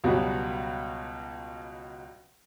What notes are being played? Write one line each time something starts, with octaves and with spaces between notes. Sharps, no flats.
C#2 B2 F#3 G3 F#4